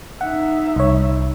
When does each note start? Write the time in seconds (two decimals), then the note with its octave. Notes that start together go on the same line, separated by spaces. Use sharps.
0.21 D#4 E5 F#5
0.76 C2 C#5